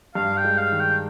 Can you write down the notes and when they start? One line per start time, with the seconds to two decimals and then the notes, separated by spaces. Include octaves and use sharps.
0.15 G2 F5
0.37 G5
0.44 G#3
0.58 F5
0.72 D#3
0.80 G5